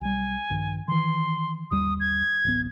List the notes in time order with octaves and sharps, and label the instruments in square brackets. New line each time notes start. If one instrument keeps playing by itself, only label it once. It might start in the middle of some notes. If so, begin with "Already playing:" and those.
[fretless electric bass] B1 G3 [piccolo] G#5
[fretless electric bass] A#1 G2 D#3
[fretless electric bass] D#3 E3 [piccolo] C6
[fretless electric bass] G1 D#2 G3 [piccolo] D#6
[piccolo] G#6
[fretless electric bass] D1 A1 B3